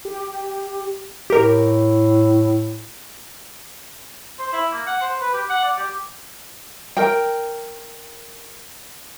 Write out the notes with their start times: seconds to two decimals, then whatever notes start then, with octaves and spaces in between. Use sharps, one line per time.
0.05 G4
1.30 A2 G4 A#4
4.39 C5
4.53 E4
4.72 A#3
4.86 F#5
5.01 C5
5.20 B4
5.34 G4
5.50 F#5
5.63 D5
5.78 G4
6.97 A#4 G5